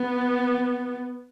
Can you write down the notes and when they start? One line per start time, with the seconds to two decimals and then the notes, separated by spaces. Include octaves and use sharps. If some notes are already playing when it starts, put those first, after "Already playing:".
Already playing: B3